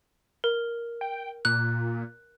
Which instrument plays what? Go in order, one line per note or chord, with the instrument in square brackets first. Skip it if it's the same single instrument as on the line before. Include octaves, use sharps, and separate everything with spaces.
[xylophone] A#4
[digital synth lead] G5
[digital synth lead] A#2 [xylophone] F#6